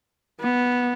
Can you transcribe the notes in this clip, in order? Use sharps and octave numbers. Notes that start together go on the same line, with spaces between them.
B3